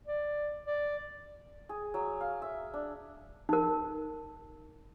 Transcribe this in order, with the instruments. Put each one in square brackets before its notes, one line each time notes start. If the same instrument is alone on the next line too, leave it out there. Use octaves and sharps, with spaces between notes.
[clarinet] D5
D5
[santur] G#4
F#3
F5
E5
D4
[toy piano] D#4 A#4